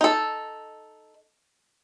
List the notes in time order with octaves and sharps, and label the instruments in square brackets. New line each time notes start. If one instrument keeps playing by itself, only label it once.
[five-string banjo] D#4 A4